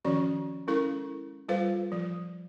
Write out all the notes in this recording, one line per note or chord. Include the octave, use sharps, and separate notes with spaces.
D#3 F3 C#4 F#4 C#6
G#3 C#4 E4 A4 A#4
G3 F4 A4 B4 C5 F5
F3